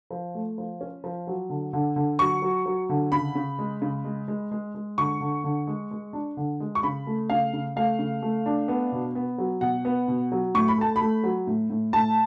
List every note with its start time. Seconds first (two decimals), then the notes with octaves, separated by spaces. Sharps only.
0.11 F3
0.35 A3
0.58 F3
0.81 C#4
1.04 F3
1.27 F#3
1.50 D3
1.73 D3
1.96 D3
2.19 F#3 C#6
2.42 F#3
2.66 F#3
2.89 D3
3.12 C#3 B5
3.35 C#3
3.59 G#3
3.82 C#3
4.04 G#3
4.28 G#3
4.51 G#3
4.75 G#3
4.98 D3 C#6
5.21 D3
5.44 D3
5.67 G#3
5.91 G#3
6.13 D4
6.37 D3
6.60 G#3
6.75 C#6
6.83 C#3 B5
7.07 A3
7.30 C#3 F5
7.53 C#3
7.76 A3 F5
7.99 C#3
8.22 A3
8.46 D4
8.68 B3
8.92 B2
9.15 B3
9.38 F#3
9.61 B2 F#5
9.85 B3
10.08 B2
10.32 F#3
10.54 A2 C#6
10.68 B5
10.78 A3 A5
10.96 B5
11.01 A3
11.24 F#3
11.47 A2
11.70 A2
11.93 A2 A5